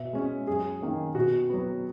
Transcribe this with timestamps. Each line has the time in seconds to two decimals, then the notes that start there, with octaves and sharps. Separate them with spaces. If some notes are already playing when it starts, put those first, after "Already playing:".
Already playing: B2 E5
0.13 G#3 C#4
0.47 F#2 G#4
0.81 D#3 A#3 C#4
1.15 B2 F#4
1.49 F#3 B3